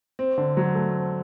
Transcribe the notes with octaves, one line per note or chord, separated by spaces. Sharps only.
C4
D3
F#3
A3
C4